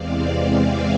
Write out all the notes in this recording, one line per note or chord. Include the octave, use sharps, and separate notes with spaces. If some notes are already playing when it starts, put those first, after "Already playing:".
Already playing: E2 C3 E3 G#3 C4 D5 F5
E5 G#5